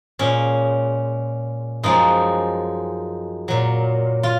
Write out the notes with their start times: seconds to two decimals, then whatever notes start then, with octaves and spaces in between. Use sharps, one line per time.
0.19 A#2 G#3 C#4
1.83 F#2 F3 G#3 D#4
3.48 A#2 F#3
4.23 F4